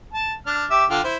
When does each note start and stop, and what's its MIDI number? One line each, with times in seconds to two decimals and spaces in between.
0.14 0.35 81
0.46 0.65 62
0.46 0.65 89
0.70 0.85 67
0.70 0.85 76
0.70 0.85 86
0.90 1.01 50
0.90 1.01 65
0.90 1.01 79
1.04 1.17 64
1.04 1.17 72